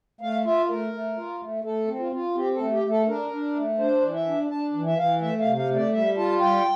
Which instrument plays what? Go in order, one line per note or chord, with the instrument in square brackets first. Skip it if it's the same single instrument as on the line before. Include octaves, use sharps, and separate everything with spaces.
[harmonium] A3 F5
F4 E5
A3 A#4
A3
F4
A3
A3 A4
C4
F4
F4
C4 G4
A3 A4
G4
A3
A4
D4 A#4
D4
A3
D4 C5
E3
E5
D4
D4 A5
E3
E5
E3 F5
A3 E5
F5
C3
F5
A3
D5
G3 E5
F4 A5
G3 G5